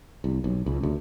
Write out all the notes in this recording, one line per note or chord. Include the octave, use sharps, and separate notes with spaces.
C2
B1
C#2
D2